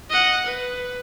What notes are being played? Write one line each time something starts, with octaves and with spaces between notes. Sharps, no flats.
D#5 F#5
B4